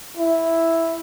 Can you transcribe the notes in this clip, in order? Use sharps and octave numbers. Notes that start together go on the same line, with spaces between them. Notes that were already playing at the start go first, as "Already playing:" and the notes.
E4